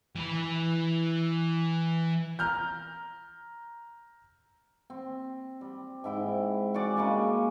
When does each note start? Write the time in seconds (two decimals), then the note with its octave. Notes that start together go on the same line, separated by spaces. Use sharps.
0.15 E3 B5
2.39 A#5 F6 G6
4.90 C4
5.61 G3
6.04 G#2 E4 G5
6.74 F#4 G#4 D5
6.96 C#3 G3 G#3 A#3